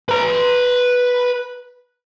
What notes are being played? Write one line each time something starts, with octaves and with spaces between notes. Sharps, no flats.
B4 A#5